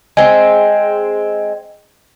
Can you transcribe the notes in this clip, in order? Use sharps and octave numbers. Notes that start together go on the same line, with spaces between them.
G#3 C4